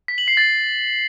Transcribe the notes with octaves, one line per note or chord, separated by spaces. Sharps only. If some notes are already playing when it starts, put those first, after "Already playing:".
B6
F#7
C7
A6